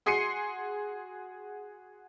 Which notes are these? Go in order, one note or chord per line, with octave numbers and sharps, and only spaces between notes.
F#4 G#4 C6 C7 C#7 D#7